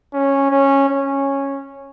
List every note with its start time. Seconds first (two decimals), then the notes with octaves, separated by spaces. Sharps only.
0.13 C#4
0.51 C#4
0.89 C#4